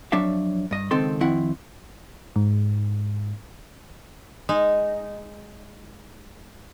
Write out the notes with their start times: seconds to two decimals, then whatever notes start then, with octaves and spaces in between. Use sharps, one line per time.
0.12 F2 F#3 D4 C#5 E5 F5
0.71 G2 D#5
0.91 C#2 D#3 C4 A4 C6
1.21 F2 D#3 C4 E4 F#5
2.36 G#2
4.49 G#3 D#4